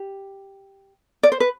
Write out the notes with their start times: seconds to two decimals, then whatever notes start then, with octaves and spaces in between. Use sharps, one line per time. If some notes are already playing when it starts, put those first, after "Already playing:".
Already playing: G4
1.23 D5
1.32 C5
1.40 B4